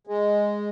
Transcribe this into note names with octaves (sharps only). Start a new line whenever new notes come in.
G#3